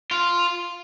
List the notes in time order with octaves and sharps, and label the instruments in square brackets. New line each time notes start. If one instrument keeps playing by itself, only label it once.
[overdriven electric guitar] F4